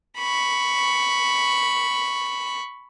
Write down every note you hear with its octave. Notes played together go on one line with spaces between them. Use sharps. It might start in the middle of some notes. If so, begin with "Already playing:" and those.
B5 C#6